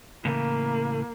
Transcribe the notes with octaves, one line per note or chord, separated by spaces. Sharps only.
A2 C#3 E3 A#3